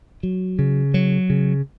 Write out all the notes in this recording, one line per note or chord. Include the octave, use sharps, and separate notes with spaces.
F#3
C#3
F#3
C#3